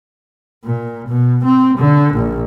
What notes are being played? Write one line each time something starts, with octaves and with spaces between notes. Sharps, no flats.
A#2
B2
C4
D3
A#1